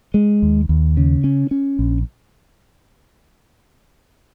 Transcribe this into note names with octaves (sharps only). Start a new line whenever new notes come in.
G#3
D#2
D#2
C#3
C#4
C#4
A#1